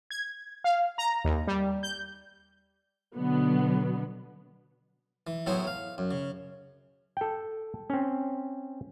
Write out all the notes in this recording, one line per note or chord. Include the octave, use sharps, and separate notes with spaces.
G#6
F5
A#5
D#2
G3
G6
B2 D3 F#3 B3
E3
A2 F#3 B3 E4 G#4 C5
F5
F#2
C#3
A4 G5
C4 C#4